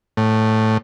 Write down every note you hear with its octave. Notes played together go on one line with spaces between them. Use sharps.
A2